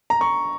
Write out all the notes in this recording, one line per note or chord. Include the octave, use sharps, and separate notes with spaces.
A#5
C#6